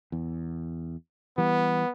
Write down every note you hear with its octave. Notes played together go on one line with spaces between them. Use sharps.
E2
E3 G3 B3